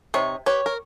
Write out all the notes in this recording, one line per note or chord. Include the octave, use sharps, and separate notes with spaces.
C3 D#4 C#5
G4 B4 C#5
A#4